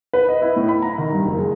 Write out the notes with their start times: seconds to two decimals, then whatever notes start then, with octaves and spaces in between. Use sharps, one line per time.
0.14 B4
0.29 D#5
0.42 E4
0.56 A2
0.69 B5
0.82 A#5
0.98 D#3
1.12 G2
1.25 F#1
1.39 G#3